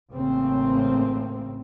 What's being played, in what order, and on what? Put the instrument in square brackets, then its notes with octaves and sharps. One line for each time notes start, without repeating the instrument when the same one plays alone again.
[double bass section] A1 A2 C#3 A#3 C4